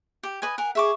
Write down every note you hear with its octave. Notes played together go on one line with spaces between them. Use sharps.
G4
B4 D#5 G#5
A#4 F#5 G#5
G#4 E5 C#6 D6